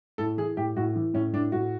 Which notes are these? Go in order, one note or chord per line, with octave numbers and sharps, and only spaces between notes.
A2 A4
E3 G#4
A2 G4
A2 F#4
E3
A2 C#4
A2 D4
A2 F#4